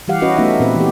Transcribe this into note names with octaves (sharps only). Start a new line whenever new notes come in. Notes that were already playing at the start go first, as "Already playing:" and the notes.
E3 G3 G4 F5 F#5
C#4 F#4 B4 D#5
A3 B3 C#4 D#4 E5
A#2 C4 B4
E3 G4